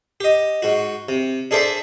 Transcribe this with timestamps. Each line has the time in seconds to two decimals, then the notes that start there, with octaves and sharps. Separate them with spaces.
0.20 G4 D#5
0.62 G#2 F#4
1.09 C3
1.51 D4 G#4 A4 C5 D5 E5